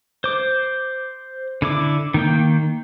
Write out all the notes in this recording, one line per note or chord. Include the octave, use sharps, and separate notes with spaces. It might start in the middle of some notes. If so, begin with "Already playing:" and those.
C5 D6
D3 E4 D6
D#3 A#3 G5